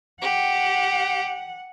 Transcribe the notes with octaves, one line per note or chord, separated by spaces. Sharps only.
G4 F#5